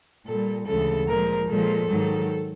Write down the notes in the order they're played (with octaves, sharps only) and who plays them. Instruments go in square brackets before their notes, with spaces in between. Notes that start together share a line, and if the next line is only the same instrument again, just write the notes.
[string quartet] A#2 G3 A4
D2 C#3 E3 G#3 A4
A#2 F3 G#3 A#4
A#2 F3 G#3 A4
G#2 D#3 F#3